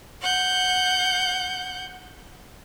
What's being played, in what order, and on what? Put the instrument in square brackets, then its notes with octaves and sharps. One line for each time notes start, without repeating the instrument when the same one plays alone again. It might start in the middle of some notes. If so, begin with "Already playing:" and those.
[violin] F#5 G6